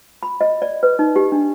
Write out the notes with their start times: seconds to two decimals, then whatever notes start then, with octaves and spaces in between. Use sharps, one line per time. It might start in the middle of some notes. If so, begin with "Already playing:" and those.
0.23 B5
0.41 D#5
0.62 D5
0.83 B4
0.99 D#4
1.16 G4
1.32 D4